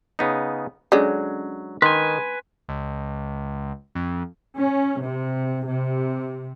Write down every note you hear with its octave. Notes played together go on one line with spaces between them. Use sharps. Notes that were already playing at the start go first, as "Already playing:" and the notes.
C#3 B3 D#4
D3 F#3 G#3 C#4 C#5
D#3 B4 G#5 C6
C#2
F2
C#4
C3
C3